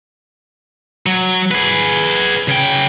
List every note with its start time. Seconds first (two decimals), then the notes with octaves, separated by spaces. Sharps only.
1.06 F#3
1.51 G#4 B4
2.48 C#3 G5